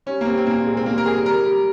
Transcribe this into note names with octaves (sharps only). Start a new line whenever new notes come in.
G3 C#4
A#3
G3 C4
C4
A#2 A#3
A#2 G#3
C4
G3 A#3
A#4
G3 G#4
G3 A#4
G3